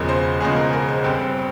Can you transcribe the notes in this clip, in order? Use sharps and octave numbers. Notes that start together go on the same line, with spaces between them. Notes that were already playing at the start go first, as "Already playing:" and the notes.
Already playing: E1 E2 C#3 F3 G#3 A#4
C5
E1 E2 C#3 F3 G#3 G#4
A#4
A#4
C5
G1 G2 G3 C4